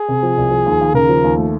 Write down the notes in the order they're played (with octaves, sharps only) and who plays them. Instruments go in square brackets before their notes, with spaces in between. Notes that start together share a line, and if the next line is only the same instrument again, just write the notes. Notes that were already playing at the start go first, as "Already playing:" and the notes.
Already playing: [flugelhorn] G#4
[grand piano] C3
F3
C2
F3
D#2
D#2
[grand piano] C#3 [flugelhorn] A#4
[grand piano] F3
D#2
A3